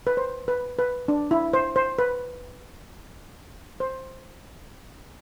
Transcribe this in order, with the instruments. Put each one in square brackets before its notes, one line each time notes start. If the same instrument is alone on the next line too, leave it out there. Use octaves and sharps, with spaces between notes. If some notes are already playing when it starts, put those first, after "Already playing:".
[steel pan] B4
C5
B4
B4
D4
E4
C5
C5
B4
C5